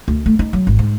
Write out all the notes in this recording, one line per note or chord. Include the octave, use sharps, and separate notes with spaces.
D2
A3
D#4
F#3
G#1
G#2